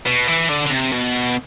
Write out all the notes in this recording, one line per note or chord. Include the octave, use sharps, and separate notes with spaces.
B2
E3
D3
D3
C3
B2